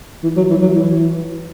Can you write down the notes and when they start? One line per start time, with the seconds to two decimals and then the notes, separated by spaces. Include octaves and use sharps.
0.24 E3
0.37 F#3
0.50 E3
0.62 F#3
0.75 E3